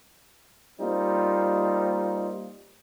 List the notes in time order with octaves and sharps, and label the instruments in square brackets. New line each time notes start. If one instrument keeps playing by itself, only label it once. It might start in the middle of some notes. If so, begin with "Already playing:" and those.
[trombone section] G3 A#3 C4 D#4 F4